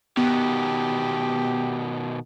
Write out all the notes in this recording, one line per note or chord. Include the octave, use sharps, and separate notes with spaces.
B2 D#3 B3 G4